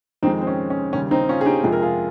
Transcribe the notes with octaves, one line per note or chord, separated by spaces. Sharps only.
F2 D#3 G#3 C4 D#4
C4
C#4
C#4
D#2 C#3 G3 C#4
C4 D#4
C#4 F4
G#4
D#4 G4
F2 C3 F3 G#3 G#4
A#4
F4 G#4